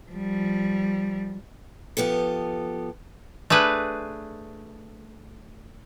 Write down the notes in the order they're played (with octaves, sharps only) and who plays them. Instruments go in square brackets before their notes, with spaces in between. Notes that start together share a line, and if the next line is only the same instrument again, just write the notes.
[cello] F3 G3
[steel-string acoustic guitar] F3 B3 G4 A4
[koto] A3 D4 G#4 B4